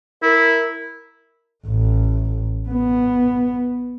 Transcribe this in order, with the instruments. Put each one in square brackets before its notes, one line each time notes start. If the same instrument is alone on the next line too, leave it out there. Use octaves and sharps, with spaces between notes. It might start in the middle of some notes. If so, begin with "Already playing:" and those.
[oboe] E4 [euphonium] A#4
[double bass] A1
B3